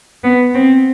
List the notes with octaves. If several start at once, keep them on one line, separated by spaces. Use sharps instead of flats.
B3
C4